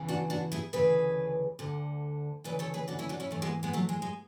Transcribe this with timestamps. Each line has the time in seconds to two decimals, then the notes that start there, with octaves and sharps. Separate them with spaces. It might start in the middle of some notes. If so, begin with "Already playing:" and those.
Already playing: E2 C#3 E3
0.09 D4 F#4
0.30 D4 F#4
0.52 E4 G#4
0.73 D2 C#3 E3 G#4 B4
1.59 D2 D3
2.44 D2 C#3 E3 B4 D5
2.59 A4 C#5
2.74 G#4 B4
2.88 D4 F#4
2.99 C#4 E4
3.09 D4 F#4
3.20 C#4 E4
3.31 G#2 E3 A3 C#4
3.42 G#3 B3
3.63 G#3 B3
3.73 F#3 A3
3.89 G#3
4.02 G#3